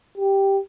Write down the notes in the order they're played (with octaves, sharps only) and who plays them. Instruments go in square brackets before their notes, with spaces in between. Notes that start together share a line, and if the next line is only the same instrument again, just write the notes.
[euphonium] G4